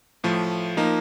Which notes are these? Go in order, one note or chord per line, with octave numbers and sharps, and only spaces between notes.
A2 F3 A3
F3 A#3 D#4